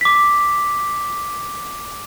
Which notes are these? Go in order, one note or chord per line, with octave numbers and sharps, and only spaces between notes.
D6 B6